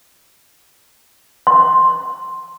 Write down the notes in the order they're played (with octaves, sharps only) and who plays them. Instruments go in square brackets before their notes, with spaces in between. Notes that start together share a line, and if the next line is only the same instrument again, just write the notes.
[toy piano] C6